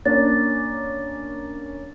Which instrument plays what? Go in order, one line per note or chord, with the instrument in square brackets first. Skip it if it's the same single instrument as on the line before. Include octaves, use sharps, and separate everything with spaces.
[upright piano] A#3 C#4 D4 [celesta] A6